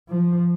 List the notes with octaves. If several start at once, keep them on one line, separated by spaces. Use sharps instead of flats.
F3